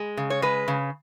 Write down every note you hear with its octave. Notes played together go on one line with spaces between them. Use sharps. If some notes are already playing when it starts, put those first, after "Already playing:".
Already playing: G#3
C#3
C#5
G#3 B4
C#3